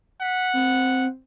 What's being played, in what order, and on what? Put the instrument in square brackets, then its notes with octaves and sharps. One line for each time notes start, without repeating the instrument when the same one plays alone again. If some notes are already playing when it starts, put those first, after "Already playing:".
[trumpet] F#5 [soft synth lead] B6
[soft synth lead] C4